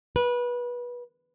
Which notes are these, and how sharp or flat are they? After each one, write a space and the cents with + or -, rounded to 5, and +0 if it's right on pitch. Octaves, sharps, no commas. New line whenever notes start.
B4 -25